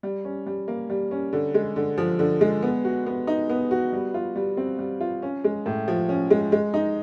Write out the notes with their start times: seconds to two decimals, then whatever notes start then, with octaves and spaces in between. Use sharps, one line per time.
0.03 G3
0.25 C#4
0.46 G3
0.68 A#3
0.90 G3
1.11 C#4
1.33 D3
1.54 G#3
1.76 D3
1.98 F3
2.19 D3
2.41 G#3
2.63 B3
2.84 F#4
3.06 B3
3.27 D#4
3.49 B3
3.71 F#4
3.93 G3
4.14 F4
4.36 G3
4.57 C4
4.79 G3
5.00 F4
5.22 C#4
5.44 G#3
5.66 A2
5.88 F3
6.09 C#4
6.30 G#3
6.52 G#3
6.74 D#4